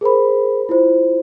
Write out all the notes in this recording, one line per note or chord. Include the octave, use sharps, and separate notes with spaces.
G#4 A#4 C5 B5
E4 F4 C5